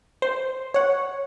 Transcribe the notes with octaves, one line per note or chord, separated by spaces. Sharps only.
C5
C#5 F#5